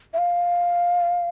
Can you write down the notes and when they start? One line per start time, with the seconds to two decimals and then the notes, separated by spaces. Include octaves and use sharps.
0.13 E5
0.18 F5